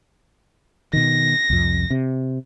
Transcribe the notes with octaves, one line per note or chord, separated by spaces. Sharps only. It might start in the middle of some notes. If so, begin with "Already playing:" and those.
B2 D#3 A#6
C2 F2
C3